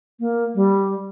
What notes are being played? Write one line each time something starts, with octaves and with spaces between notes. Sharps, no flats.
A#3
G3